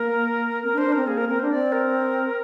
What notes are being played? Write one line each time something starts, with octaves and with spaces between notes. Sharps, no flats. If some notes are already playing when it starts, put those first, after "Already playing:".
Already playing: A#3 A#4
C4 A#4
D4
C5
D4
C4 A#4
A#3 G#4
A#4
C4 A#4
D4 C5
C4 D5
A#4